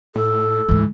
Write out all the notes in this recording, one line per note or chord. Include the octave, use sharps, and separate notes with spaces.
A2 A4
D2 G#2 E3